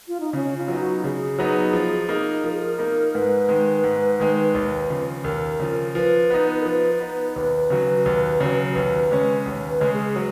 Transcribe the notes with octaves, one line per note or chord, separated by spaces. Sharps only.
F4
D#4
C#3 C#4
F4
F#3 B3 D#4
F#4
C#3 G#4
F#3 B3 D#4
F3
A#3 D#4
F3 A#4
G#4
A#4
A#3 D#4
G#2 B4
D#3 G#3
G#2
D#3 G#3
D#2
C#3 F3
D#2 A#4
C#3 F3
F3 B4
B3 D#4
A#4
F3 B4
B3 D#4
D#2 B4
C#3 F#3
D#2
C#3 F#3
D#2 B4
C#3 G#3 C#4
D#2
B4
C#3 G#3 C#4
G#4
F#3